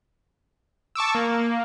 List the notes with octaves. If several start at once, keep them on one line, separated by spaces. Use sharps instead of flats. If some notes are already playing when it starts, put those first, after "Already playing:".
A5 C#6 D6 E6
A#3